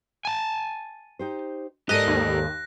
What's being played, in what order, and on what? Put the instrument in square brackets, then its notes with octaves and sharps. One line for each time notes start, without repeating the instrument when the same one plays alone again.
[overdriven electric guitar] G#5 A5
[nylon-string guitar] D#4 G4 C5
[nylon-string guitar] G#2 A4 D5 [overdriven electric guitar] G4 A#4 [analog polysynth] D#5 [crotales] F#6 A#6
[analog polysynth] D#2